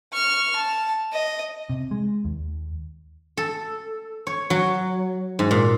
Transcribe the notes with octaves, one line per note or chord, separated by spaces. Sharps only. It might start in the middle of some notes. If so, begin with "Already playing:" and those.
C#6 F6
A5
D#5
C3
G#3
D#2
A4
C#5
F#3
G#2
A#2